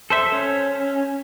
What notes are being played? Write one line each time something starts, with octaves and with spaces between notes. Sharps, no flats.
A4 C5 E5
C#4